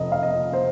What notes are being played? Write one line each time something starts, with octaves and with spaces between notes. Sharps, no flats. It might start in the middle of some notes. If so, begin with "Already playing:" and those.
Already playing: F1 D#5
F5
D#5
C5